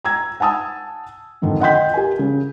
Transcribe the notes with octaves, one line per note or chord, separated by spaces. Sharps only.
A#5 E6 G#6
F#5 G#5 A5 D#6 E6
F2 G#2 D3 D#3
D#5 F#5 G5 C6 G6 B6
G4 A#4 G#5
C#3